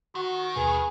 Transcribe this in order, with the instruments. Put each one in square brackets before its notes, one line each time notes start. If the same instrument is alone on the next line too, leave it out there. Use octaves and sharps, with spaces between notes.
[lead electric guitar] D#3 [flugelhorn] F#4
[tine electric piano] A#1 D#2 B2 [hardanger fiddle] G#4 [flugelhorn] B4